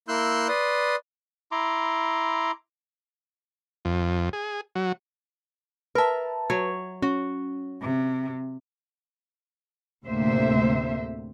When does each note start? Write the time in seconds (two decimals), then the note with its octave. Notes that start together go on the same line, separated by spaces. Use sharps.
0.08 A#3 E4 C6 E6 F#6 G6
0.48 B4 D5 C6 D#6
1.52 E4 A#5 C6 D6
3.85 F2
4.33 G#4
4.75 F#3
5.95 A#4 B4 E5 A5
6.50 F#3 C#5
7.02 C#4 F#4
7.81 C3
10.05 D2 A2 C3 A#3 C5 E5